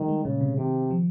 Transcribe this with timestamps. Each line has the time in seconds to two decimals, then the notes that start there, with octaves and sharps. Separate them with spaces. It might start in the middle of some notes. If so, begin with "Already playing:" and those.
Already playing: D#3 G3
0.08 G#3
0.24 A#2 C#3
0.41 C3
0.58 C3 D#3
0.91 F3